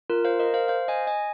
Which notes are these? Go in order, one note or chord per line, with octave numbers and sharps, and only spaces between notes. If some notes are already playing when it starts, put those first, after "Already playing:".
F4 A#4
C5 F5
A#4 D#5
C5 F5
C5 F5
D#5 G#5
D#5 G#5